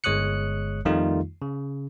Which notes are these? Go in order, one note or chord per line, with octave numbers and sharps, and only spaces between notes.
G1 G#3 C#5 D#6 F#6 C#7
F2 D#3 G3 A3 D#4 F4
C#3